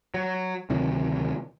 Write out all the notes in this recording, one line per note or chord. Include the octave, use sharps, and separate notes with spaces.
F#3
D2 C3 D#3 F#3